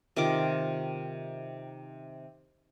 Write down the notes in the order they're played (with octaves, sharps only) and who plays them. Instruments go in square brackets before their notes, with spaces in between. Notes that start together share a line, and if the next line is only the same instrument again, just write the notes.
[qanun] C3 D#3 F4 D6